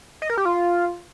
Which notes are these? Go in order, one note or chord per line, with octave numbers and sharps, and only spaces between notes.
D#5
A#4
G4
F4